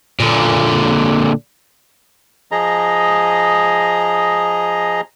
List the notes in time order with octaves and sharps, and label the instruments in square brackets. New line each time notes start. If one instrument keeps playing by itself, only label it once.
[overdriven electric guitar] A#2 D3
[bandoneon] F3 G#4 D#5 A#5